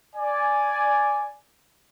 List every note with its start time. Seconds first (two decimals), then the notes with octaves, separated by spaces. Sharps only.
0.16 D5 G#5